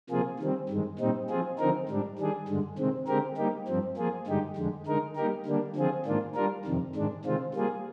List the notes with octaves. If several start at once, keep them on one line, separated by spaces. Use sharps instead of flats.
C3 F3 A#3 F4 G#4
D#3 G3 C4
G2 D#3 G#3
A#2 G3 C4 D#4
F3 C4 F4 G#4
D3 F3 C4 D#4 A#4
G#2 G3 D4
D#3 G3 D4 G#4
G2 D3 G#3
C3 D#3 G#3 C4
D3 G#3 C4 G4 A#4
G3 A#3 D#4 G4
G2 F3 C4
F3 A#3 F4 G#4
G2 D3 G#3 D#4 G4
F2 D3 G#3
D3 G#3 D#4 A#4
G3 A#3 D#4 G4 A#4
D3 G3 A#3 D4
D3 F3 C4 F4 G#4
G#2 D#3 A#3 D4 F4
G3 D4 F4 A#4
F2 C3 D#3
G#2 D#3 G#3 D4
C3 D#3 G#3 C4 F4
G3 A#3 F4 G#4